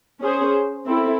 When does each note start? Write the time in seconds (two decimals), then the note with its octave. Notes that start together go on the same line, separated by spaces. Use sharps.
0.22 C#4 G#4 C5
0.87 C4 E4 A4